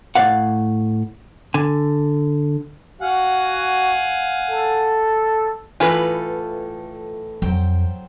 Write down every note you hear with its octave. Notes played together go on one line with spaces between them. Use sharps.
A2 D5 F5 F#5
D3 G#5
F#4 F5 F#5 G#5
A4
A2 E3 F4 A4 B4 G#5
F2 F#3 C5 G5